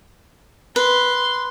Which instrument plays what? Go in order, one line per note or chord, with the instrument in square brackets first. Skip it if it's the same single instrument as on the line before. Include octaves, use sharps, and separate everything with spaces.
[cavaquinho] B4 [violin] C6